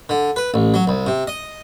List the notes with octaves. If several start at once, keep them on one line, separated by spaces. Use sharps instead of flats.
D3
B4
A1
F#3
C2
C3
D#5